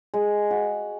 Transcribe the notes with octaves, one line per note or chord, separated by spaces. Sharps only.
G#3
F#4